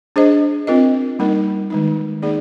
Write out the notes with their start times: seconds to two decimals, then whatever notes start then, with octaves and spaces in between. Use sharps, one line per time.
0.16 D4 G#4 C5 D#5
0.67 C4 F4 A#4 D#5
1.19 G3 A#3 D#4 A#4
1.70 D#3 G#3 D#4
2.22 A#3 D#4 G#4 D5